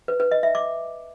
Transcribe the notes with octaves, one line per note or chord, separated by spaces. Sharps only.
B4
B4
D#5
E5
D6